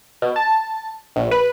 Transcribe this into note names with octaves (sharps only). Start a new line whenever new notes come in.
B2
A5
A#1
B4